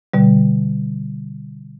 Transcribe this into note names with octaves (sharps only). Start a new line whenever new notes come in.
B2 D3 G3